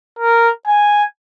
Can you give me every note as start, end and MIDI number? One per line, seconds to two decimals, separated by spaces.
0.19 0.50 70
0.67 1.04 80